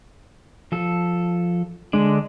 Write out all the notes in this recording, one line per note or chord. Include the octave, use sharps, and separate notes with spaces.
F3 A4
D3 G#3 D4